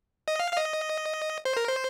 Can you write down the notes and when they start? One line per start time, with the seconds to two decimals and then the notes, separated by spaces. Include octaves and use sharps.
0.28 D#5
0.40 F5
0.53 F5
0.57 D#5
1.45 C5
1.57 A#4
1.68 C5